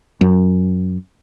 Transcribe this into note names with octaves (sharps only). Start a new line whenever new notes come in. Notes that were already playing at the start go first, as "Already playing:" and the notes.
F#2